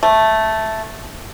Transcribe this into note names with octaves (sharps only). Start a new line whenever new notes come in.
A3